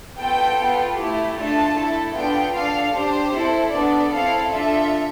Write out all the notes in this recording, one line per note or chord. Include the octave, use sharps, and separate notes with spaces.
B3 F4 A4 G5
B3 F4 A4
A3 E4 G4
A3 D4 F4 A4 A5
A3 E4 A4
B3 D4 F4 A4 G5
D4 A4 F5
D4 G4 C5
C4 E4 A4
B3 D4 A4 D5
C4 E4 A4 F5
D4 F4 A4 E5